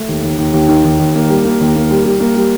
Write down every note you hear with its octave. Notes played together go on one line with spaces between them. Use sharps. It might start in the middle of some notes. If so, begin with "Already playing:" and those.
Already playing: A3
D#2
D#2
D#2
D#2
D#3
D#2
D#2
A#3
G3
A#3
D#2
A#3
G3
G3
A#3
G3